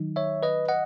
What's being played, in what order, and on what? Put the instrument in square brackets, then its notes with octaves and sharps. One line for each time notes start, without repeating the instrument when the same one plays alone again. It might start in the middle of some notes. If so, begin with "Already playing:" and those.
Already playing: [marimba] D#3 F#3 D#4
[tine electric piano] C#5 E5
B4 D#5
D#5 F#5